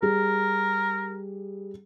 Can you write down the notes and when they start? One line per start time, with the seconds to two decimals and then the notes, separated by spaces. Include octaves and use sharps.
0.02 G3 G#4 A#4